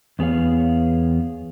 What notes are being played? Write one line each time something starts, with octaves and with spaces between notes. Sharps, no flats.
E2 B3 G#4 C#5 F5